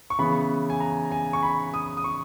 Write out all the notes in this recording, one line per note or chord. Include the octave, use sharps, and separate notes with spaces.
C#6
C#3 E3 B3 B5
G#5
A#5
G#5
C#6
B5
D#6
D#6
C#6